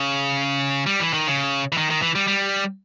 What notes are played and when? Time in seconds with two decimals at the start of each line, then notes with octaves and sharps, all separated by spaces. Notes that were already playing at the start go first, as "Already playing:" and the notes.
Already playing: C#3
0.86 G3
1.00 E3
1.13 D#3
1.27 C#3
1.72 E3
1.78 D#3
1.90 D#3
2.02 E3
2.15 G3
2.28 G3